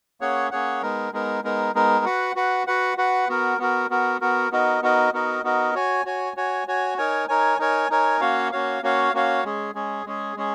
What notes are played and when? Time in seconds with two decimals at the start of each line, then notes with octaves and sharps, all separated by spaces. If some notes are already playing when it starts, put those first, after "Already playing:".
0.21 A#3 C#4 G#4 C#5 F#5
0.51 A#3 C#4 G#4 C#5 F#5
0.82 G#3 B3 D#4 A#4
1.13 G#3 B3 D#4 A#4
1.44 G#3 B3 D#4 A#4
1.75 G#3 B3 D#4 A#4
2.05 F#4 B4 F#5
2.36 F#4 B4 F#5
2.67 F#4 B4 F#5
2.97 F#4 B4 F#5
3.28 B3 F#4 A#4
3.59 B3 F#4 A#4
3.90 B3 F#4 A#4
4.21 B3 F#4 A#4
4.51 B3 D#4 F#4 A#4 D#5
4.82 B3 D#4 F#4 A#4 D#5
5.13 B3 D#4 F#4 A#4 D#5
5.44 B3 D#4 F#4 A#4 D#5
5.75 F#4 C#5 G#5
6.05 F#4 C#5 G#5
6.37 F#4 C#5 G#5
6.68 F#4 C#5 G#5
6.98 D#4 A#4 C#5 G#5
7.28 D#4 A#4 C#5 G#5
7.59 D#4 A#4 C#5 G#5
7.90 D#4 A#4 C#5 G#5
8.21 A#3 C#4 F#4 C#5 F5
8.52 A#3 C#4 F#4 C#5 F5
8.83 A#3 C#4 F#4 C#5 F5
9.13 A#3 C#4 F#4 C#5 F5
9.44 G#3 C#4 G#4
9.74 G#3 C#4 G#4
10.05 G#3 C#4 G#4
10.36 G#3 C#4 G#4